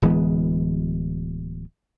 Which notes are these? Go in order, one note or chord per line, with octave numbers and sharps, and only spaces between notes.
D1 E3 G#3 B3